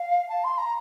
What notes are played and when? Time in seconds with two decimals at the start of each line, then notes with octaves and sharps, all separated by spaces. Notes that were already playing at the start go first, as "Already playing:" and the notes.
Already playing: F5
0.29 A5
0.44 C6
0.58 A#5